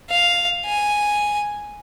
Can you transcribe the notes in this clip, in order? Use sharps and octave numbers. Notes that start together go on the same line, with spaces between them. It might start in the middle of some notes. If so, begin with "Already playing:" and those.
F5
G#5